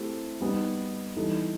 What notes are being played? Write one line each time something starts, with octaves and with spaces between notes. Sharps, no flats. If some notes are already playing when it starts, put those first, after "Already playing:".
Already playing: A3 C4 E4 G4
G3 B3 D#4
E3 G3 D#4 A4